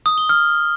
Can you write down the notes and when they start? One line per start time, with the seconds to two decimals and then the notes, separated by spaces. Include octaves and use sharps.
0.06 D#6
0.18 G7
0.29 F6